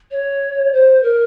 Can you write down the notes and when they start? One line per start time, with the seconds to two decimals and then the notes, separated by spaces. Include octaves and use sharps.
0.11 C#5
0.73 C5
1.03 A#4